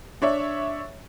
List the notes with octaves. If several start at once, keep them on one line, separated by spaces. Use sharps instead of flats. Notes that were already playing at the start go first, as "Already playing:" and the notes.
D4 C#5 E5